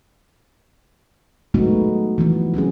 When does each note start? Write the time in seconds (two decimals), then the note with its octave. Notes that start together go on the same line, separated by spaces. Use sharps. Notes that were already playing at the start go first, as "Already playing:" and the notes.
1.54 F#3 G#3 A3 B3 D#4 F#4
2.18 E3 F3 B3
2.54 F#3 C4 C#4 G#4